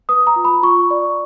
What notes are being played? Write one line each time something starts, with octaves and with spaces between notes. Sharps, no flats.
B4 D#6
A#5
F4
B5
F4 C#6
D5